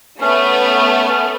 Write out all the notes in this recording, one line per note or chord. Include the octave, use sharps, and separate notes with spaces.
A3 B3 C#4